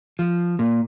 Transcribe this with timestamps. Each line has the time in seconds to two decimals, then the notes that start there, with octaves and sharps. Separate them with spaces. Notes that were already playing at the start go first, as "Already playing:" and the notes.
0.19 F3
0.59 A#2